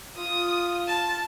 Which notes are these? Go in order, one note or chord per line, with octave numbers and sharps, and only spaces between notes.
F4 D#6
A5